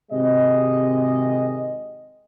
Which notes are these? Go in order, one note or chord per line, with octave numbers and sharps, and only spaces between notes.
G#1 C3 G#3 G4 D#5